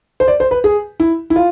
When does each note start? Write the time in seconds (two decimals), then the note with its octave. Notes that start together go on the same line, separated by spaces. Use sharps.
0.20 C5
0.28 D5
0.40 C5
0.51 B4
0.64 G#4
1.00 E4
1.30 E4
1.36 F4